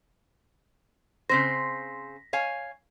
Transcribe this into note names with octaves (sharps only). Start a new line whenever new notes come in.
C#3 C4 C5 A#6 B6
C#5 F5 G#5